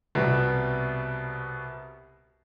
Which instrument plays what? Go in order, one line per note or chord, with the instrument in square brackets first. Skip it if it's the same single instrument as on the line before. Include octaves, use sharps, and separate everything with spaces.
[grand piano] C2 B2 G3 B3